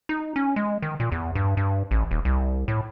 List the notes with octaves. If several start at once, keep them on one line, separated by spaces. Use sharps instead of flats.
D#4
C#4
G#3
D#3
A#2
E2
G2
G2
A1
D#1
C2
A2